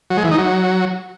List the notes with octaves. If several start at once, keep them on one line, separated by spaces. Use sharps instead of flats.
F#3
G#3
E3
D#4
F#3